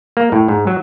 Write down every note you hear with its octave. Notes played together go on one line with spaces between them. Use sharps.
A#3
A2
G#2
F#3